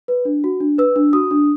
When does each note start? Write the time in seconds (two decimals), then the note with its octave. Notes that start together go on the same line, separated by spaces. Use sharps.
0.08 B4
0.25 D4
0.44 F#4
0.60 D4
0.78 B4 E6
0.96 D4
1.13 F#4 D#6
1.31 D4